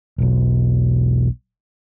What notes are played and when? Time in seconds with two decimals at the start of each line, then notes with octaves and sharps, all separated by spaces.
0.18 E1 B1